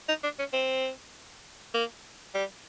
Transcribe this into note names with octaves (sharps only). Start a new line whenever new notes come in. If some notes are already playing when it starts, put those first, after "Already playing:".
D#4
D4
C#4
C4
A#3
G3